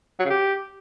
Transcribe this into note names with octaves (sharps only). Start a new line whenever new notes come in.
F#3
C#3
G4